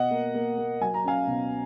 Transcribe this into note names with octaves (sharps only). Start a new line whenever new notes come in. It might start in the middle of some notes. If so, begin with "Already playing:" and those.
Already playing: B2 D#5 F#5
A#3
A#3
A#3
F#3 G#5
A#5
C#4 F5 G#5
B2